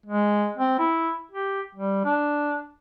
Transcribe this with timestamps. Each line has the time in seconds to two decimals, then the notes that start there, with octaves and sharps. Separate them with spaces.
0.06 G#3
0.57 C4
0.79 E4
1.32 G4
1.75 G3
2.05 D4